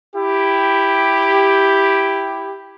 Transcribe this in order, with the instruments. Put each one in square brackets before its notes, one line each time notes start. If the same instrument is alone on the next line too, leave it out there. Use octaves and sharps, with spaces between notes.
[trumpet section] E4 G4